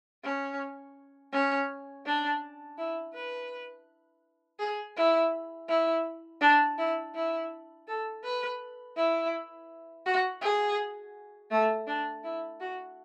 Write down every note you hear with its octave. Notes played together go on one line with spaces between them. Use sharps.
C#4
C#4
D4
E4
B4
G#4
E4
E4
D4
E4
E4
A4
B4
E4
F#4
G#4
A3
D4
E4
F#4